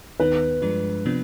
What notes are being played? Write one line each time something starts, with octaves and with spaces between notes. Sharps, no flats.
D#2 D#3 B3 D#4 B4
G2 F3 G#3 D4
C3 F3 B3 D4